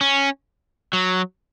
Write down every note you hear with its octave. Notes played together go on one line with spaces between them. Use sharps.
C#4
F#3